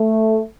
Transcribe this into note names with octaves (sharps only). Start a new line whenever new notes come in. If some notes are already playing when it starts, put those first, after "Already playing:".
Already playing: A3